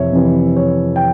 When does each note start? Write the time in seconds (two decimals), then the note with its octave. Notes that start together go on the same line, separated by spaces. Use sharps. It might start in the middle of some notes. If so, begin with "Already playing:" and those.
Already playing: F2 C3 E3 C#5 E5
0.12 F2 C3 E3
0.56 C#5
0.96 G5